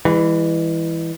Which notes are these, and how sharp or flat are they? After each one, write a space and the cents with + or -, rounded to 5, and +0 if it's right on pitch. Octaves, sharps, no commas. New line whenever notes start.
E3 +0 G#3 -40